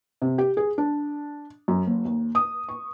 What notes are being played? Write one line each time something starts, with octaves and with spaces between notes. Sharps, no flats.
C3
G4
G#4
D4
F#2
F#1
D#2
D#6
C#6